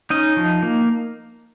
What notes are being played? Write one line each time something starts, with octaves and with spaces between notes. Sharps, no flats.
C#4 D#4 D#5
F3
A#3